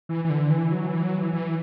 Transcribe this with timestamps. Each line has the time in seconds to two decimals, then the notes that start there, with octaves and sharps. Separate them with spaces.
0.09 E3
0.25 E3
0.30 D3
0.50 E3
0.72 F#3
0.87 E3
1.02 F#3
1.18 E3
1.33 E3